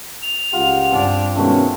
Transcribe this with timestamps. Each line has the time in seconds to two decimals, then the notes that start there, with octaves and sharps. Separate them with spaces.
0.23 F7
0.53 C#2 F4 G4 F#5
0.91 G2 C4 D4
1.36 B2 D#3 G#3 A3 C#4 F#4